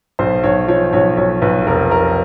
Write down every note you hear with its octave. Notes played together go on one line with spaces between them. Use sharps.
B1 C5
B1 C#5
F3 C#5
B1 C#5
B1 C#5
B1 B4
F1 A#4
F1 A#4